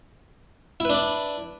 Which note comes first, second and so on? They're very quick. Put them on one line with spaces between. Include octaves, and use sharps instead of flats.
E4 B4 D4 D5